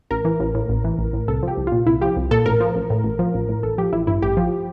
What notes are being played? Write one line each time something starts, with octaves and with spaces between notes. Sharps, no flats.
A1 A#4
E3
A1
A2
A1
E3
A1
A2
C2 A4
F3 G4
C2
A#2 F4
C2 E4
F3 G4
C2
A#2 A4
A1 A#4
F3
A1
A2
A1
F3
A1
A2
A1 A4
F3 G4
A1 E4
G2 E4
A1 G4
F3